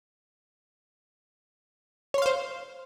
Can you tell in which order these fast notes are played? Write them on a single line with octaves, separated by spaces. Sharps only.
C#5 C6 F5 C5